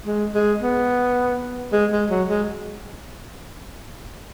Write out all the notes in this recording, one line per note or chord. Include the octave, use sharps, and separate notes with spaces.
G#3
G#3
B3
G#3
G#3
F#3
G#3